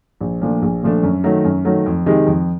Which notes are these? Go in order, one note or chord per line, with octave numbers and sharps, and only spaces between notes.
A#1
A#2 F3 A3 D4
A#1
A#2 F3 A3 D4
F#2
D#3 F#3 A3
F#2
D#3 F#3 A3
F2
C3 D#3 G#3
F2